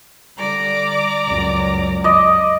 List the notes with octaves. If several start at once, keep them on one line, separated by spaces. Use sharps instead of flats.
D3 G3 D5 A#5 D6
C#2 F#2
D5 D#5